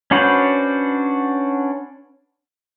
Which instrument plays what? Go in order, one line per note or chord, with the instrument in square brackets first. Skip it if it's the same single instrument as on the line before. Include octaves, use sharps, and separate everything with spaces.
[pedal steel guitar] C#4 D4 F#4 B4 C5